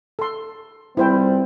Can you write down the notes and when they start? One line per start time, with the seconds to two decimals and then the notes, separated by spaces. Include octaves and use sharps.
0.19 A4 C6
0.97 C#2 C3 G3 C4 E4 C5 G5